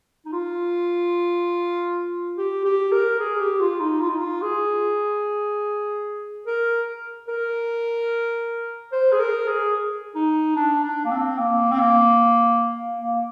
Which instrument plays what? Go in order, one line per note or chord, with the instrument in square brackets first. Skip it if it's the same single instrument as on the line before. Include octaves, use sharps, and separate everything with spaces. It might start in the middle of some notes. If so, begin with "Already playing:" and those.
[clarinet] D#4
F4
G4
G4
A#4
G#4
G4
F4
D#4
F4
D#4
F4
G#4
A#4
A#4
C5
G#4
A#4
G#4
D#4
D4
D4
A#3
C4
A#3
C4
A#3
A#3